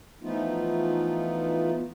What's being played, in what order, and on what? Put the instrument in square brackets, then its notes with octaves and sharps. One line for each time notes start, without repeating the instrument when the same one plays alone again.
[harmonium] E3 F3 A3 B3 D#4 F4